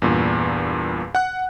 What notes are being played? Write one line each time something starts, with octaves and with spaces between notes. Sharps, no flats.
E2 G2 A#2
F#5 F#6